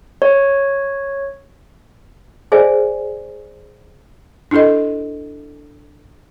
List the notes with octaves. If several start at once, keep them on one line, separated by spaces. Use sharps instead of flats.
C#5
G#4 C5 D5 E5 G#5
D4 E4 G4 A4 D#5